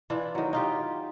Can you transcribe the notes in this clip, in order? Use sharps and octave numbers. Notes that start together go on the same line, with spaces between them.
E3 D4 E4 F4
D#3 F#3
D#4 F4 G4